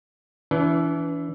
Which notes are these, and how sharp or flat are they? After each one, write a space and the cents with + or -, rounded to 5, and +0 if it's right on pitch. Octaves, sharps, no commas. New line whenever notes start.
E3 +0 D4 -45